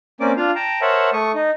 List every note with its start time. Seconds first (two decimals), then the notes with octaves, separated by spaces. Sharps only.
0.21 A#3 C4 C#4 D5 D6
0.37 D4 F4 F5
0.55 G5 A5 A#5
0.82 A#4 C5 C#5 E5 F#5 A5
1.13 A3 C#6 D#6
1.35 D#4